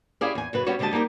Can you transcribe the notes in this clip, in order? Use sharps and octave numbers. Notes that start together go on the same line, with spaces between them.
C#4 E4 G4 G#4 D5 F5
E2 G#5
F#2 C#3 B4
G3 B3 C#4 F#4 C#5
D2 D3 G#3 G4 D#5 A5
G3 A#3 D#4 G4 A#4